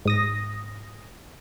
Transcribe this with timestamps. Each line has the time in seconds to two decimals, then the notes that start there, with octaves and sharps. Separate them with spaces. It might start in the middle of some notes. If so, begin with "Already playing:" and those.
0.05 G#2 D#6 A#6